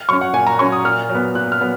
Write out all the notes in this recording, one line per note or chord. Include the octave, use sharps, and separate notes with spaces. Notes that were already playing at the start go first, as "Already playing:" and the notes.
Already playing: F6
F#3 C#4 C#6
F#5
A#2 G#5
A#5
F#3 C#4 C#6
D#6
A#2 F6
F#3
B3
A#2 F#6
F6
F#3 B3